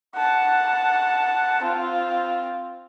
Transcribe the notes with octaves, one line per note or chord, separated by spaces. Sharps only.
F#5 A5
C4 F4